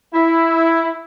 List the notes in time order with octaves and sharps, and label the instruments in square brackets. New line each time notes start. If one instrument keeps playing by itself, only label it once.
[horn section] E4